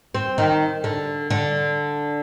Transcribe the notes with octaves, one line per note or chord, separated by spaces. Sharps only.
C4
D#3
D3
D3